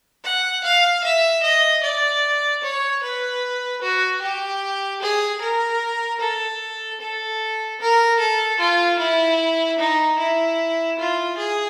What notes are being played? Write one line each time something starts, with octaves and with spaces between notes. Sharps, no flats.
F#5
F5
E5
D#5
D5
C#5
B4
F#4
G4
G#4
A#4
A4
A4
A#4
A4
F4
E4
D#4
E4
F4
G#4